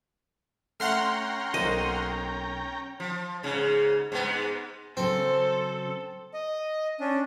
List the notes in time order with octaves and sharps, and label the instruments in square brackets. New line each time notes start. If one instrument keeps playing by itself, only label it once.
[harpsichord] A3 [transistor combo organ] C#4 G5 A#5 [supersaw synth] F#5 C6 F6
[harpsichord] B1 A#3 C5 [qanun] D#5
[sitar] F3
G#2 C#3
G#2 G#3 B3
[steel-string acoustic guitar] C#3 F#3 [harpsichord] C4 [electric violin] A4 [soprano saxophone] C5
[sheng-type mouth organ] D#5
C#4 D4